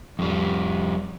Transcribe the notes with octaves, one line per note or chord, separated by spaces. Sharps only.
F2 G3